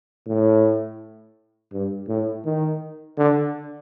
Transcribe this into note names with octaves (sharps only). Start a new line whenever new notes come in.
A2
G2
A2
D#3
D3